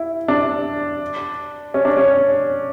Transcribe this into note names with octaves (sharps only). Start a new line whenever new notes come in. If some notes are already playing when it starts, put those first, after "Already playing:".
Already playing: E4
D4
C#4
D4
C#4